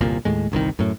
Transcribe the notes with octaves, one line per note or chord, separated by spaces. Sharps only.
G1 C2 A#2
D#2 A2 G#3
G1 C2 D3 D#3
F#2 A2